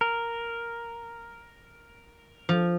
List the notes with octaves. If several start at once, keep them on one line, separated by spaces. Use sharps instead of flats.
A#4
F3